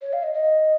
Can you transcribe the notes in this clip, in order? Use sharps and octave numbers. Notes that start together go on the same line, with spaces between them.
C#5
F5
D#5
D#5